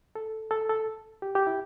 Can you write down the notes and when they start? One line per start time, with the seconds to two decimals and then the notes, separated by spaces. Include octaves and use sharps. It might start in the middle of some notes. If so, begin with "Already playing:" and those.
0.15 A4
0.51 A4
0.70 A4
1.22 G4
1.35 G4
1.47 E4